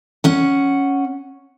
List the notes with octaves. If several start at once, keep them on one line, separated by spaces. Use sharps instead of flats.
C#4 F#5